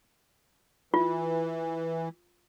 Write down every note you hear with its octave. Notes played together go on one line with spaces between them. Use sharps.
E3 F4